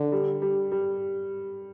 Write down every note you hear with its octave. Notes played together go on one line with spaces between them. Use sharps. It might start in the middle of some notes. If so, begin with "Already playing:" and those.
Already playing: D3
G3
G3
G3